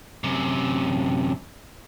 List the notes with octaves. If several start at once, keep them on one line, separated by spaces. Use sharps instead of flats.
F#2 C3